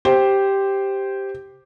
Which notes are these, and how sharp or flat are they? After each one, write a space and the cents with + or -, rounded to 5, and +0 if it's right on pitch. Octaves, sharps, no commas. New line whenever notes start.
G4 +0 C5 +0